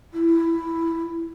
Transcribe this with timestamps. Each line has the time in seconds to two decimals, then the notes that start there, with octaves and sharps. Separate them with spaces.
0.13 E4